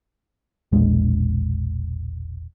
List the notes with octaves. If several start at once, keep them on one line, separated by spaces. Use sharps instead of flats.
E1 A#1 G#3